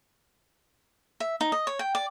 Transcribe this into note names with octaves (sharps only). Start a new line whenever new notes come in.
E5
D#4
D#5
C#5
G5
D5